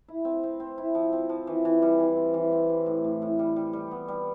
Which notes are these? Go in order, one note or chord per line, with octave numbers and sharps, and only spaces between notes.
E4
C4
C4
C4
E4
F3
C4
F3
E3
E3
G3
E3
C4
E3
C4
G3
A2
A2
A2
G3
G3
G3
B3
G3